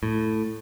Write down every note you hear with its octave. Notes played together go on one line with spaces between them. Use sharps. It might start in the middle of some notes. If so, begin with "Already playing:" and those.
A2